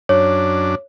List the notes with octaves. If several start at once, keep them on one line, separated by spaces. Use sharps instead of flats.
F#2 D4 C#5